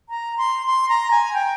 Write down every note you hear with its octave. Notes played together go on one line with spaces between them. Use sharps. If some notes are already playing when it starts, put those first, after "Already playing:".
A#5
C6
C6
A#5
G#5
G5